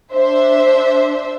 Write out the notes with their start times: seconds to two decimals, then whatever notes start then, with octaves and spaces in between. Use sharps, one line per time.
0.13 D4 C5 E5